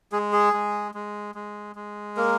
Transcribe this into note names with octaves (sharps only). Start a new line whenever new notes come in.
G#3 G#4
G#4
G#3
G#3
G#3
G#3
A#3 A#4